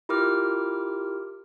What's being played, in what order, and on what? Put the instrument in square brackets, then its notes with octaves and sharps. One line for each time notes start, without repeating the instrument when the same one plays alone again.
[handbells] E4 F4 G4 A#4 D6 F6